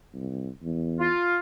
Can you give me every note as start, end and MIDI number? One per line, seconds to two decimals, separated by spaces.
0.13 0.49 36
0.62 1.09 40
1.00 1.39 65